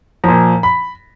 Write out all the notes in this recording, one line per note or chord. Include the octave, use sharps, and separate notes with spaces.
A#2 F3 A#5
B5